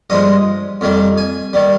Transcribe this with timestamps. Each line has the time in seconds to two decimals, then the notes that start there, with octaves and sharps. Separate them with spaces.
0.10 G2 F3 G#3 D#5
0.81 F2 D#3 G3
1.18 G#5
1.53 D#3 G3